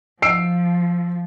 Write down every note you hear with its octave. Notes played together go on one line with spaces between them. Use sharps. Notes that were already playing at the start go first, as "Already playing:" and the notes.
F3 E6 C7 D7